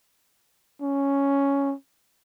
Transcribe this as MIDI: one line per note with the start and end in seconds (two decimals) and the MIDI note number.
0.82 1.74 61